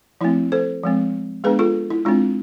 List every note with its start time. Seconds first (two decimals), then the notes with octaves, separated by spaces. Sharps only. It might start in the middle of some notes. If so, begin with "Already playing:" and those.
0.21 F3 A3 C4 E4
0.52 A4 C5
0.83 F3 G#3 C4
1.44 G#3 B3 D4 G#4 B4
1.59 F4 A4
1.90 E4
2.05 G#3 C4 D4 F4